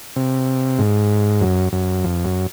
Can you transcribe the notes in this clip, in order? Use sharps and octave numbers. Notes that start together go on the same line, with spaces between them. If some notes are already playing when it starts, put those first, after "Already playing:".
C3
G#2
F#2
F#2
F2
F#2